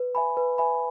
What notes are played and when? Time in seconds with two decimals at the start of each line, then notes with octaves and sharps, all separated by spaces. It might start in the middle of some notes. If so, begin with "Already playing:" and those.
Already playing: B4
0.15 E5 G#5 B5
0.37 B4
0.58 E5 G#5 B5